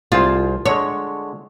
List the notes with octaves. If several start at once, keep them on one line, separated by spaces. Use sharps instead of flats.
C2 F4 G#4 C5
D3 G#3 C#5